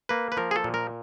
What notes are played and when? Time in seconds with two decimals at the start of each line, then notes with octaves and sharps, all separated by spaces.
0.09 A#3 B4
0.32 B4
0.37 F3 A#4
0.51 G#4
0.56 A4
0.64 A#2
0.74 A#4